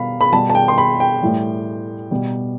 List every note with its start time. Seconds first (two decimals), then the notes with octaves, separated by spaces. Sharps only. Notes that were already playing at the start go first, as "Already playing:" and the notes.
Already playing: B2 G3 F5 B5
0.21 B5
0.32 B2 G3 A5
0.50 A5
0.55 G5
0.68 C6
0.78 B5
1.00 G5
1.23 A2 E3 G3
2.11 B2 G3